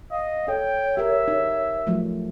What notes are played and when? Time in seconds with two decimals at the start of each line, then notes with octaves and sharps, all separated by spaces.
0.11 D#5 F5
0.48 A4 C#5 G5
0.97 G4 A#4 E5
1.28 D#4
1.87 F3 F#3 A3